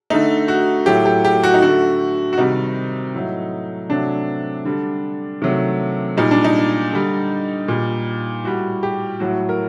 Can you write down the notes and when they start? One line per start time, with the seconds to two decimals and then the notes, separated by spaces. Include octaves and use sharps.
0.10 D3 A3 D#4
0.48 F#4
0.86 A2 F#3 A3 G4
1.06 G4
1.25 G4
1.43 F#4
1.54 D#4
1.62 D3 A3 F#4
2.33 F#4
2.38 C3 D#3 G3 D#4
3.14 A2 F#3 A3
3.89 C3 F#3 A3 D4
4.65 D3 G3
5.42 C3 D#3 F#3 A3
6.17 A#2 G3 D#4
6.31 D4
6.44 D#4
6.93 D3 G3
7.68 A#2 G3
8.44 A2 G3 F#4
8.83 G4
9.20 A2 F#3 A3 F#4
9.49 A#4